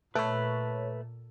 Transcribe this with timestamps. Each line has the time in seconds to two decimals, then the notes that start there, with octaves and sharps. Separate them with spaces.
0.15 A#2 A3 A4 B4 C#5 B5